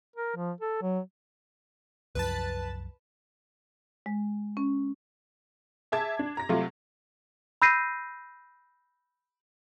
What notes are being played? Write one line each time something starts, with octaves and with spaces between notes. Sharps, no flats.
A#4
F3
A4
F#3
C2 F#2 F3 B4 A5
G#3
C#4
G#4 E5 A5 D6 G#6
D4
A#5 A#6
C3 F#3 A3 F4
B5 E6 G6 A#6 C7 D#7